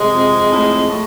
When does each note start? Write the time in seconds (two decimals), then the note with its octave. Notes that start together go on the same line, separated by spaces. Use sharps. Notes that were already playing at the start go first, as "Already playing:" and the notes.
Already playing: C3 G#3
0.12 F2
0.50 A2
0.87 A2